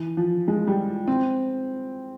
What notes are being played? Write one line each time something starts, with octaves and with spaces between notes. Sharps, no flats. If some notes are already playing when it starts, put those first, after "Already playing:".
Already playing: E3
F3
G#3
G3
C4